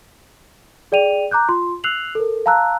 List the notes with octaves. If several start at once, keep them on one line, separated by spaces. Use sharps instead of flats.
G#4 D5 G5 D#7 F7
A#5 D6 F#6 G6
F4 C6
E6 F#6 C7 F7 F#7
A4 A#4
F5 A5 A#5 E6 F#6